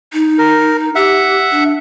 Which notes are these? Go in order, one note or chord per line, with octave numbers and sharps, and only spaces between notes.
D#4
A#4
G4 E5 F#5
D4